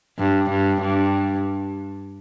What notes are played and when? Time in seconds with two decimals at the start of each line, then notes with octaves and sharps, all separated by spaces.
0.19 G2
0.50 G2
0.81 G2